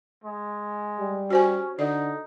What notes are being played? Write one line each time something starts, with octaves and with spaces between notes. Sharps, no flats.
G#3
G3
C#4 F#4 C5 G#5
D3 D#4 D5